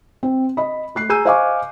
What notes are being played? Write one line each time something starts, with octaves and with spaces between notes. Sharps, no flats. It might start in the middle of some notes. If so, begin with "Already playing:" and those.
C4
D#5 B5
A3 F#6 C7
G#4 G#5 A#5 E6 G6 D#7
C5 D#5 F5 G#5 C#6 D6